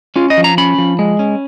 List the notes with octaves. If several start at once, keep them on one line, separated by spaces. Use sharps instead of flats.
C#4 F4
D#5
F3
A#5
C#4 B5
F3
G#3
C#4